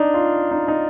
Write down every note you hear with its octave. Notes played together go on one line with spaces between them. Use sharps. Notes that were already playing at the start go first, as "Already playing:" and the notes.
Already playing: D4 D#4
F4
D#4
D#4